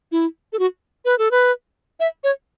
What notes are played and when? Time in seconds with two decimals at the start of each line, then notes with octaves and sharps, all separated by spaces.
0.12 E4
0.53 A4
0.59 F#4
1.05 B4
1.18 A4
1.31 B4
2.00 E5
2.24 C#5